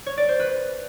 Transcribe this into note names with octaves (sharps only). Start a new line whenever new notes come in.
C#5
D5
C5
B4